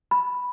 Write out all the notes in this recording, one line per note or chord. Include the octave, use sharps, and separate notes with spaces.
B5